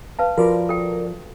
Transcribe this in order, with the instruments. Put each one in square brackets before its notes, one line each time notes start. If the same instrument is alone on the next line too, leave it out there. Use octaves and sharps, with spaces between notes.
[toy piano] B4 F5 A5
[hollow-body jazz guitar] F3 [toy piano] F4 F#4 [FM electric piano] A#4 D5
[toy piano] A4 G5